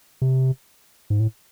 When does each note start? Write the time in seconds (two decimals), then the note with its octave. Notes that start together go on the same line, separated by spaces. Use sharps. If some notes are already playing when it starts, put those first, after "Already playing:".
0.22 C3
1.10 G#2
1.20 A2